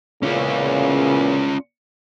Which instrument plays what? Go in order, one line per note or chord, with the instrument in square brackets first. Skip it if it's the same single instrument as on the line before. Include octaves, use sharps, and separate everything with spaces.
[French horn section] E2 A#2 C#3 [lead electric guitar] C#4 F4